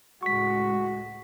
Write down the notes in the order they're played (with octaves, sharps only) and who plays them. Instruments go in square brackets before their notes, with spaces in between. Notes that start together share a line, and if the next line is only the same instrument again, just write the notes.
[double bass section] C#2 A2 G#3 [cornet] F#4 [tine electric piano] C#6 B6